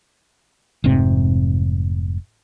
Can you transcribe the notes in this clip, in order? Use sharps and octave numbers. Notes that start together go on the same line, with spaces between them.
F1 G#2 C3 C4